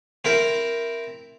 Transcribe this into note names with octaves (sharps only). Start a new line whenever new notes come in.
C4 E4 A#4